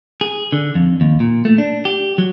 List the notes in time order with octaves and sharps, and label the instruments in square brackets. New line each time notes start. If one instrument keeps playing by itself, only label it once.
[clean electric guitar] G#4
D3
F2
D#2
A#2
A3
D4
G4
F#3